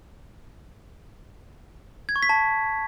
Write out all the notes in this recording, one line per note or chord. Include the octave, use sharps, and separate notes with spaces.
G#6
C#6
B6
A5